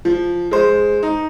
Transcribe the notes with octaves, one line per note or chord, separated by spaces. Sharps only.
F3
G#3 C5
D#4